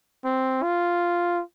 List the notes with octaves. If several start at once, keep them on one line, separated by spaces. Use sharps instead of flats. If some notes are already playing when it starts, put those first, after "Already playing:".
C4
F4